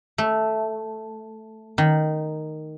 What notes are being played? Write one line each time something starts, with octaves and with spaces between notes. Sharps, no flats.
A3
D#3